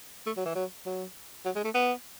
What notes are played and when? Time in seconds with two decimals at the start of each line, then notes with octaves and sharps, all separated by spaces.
0.26 A3
0.37 F#3
0.46 E3
0.55 F#3
0.86 F#3
1.45 F#3
1.56 G#3
1.64 A3
1.75 B3